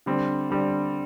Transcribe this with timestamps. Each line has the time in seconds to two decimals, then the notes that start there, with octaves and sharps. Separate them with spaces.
0.06 D3 G3 C4
0.50 D3 G3 C4